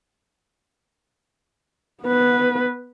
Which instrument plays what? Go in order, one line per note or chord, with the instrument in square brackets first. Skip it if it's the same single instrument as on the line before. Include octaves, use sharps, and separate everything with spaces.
[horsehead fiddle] B3 B4